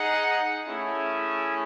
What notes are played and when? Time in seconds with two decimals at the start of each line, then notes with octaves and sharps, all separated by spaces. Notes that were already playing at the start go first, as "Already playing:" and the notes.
Already playing: D#4 G#4 D#5 F#5
0.67 A3 C#4 E4 G#4